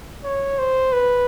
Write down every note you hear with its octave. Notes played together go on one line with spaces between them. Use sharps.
C#5
C5
B4